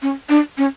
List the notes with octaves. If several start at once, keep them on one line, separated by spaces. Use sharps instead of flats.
C#4
D4
C#4